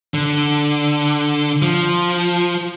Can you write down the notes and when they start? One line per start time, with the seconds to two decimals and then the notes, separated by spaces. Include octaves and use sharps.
0.14 D3
1.62 F3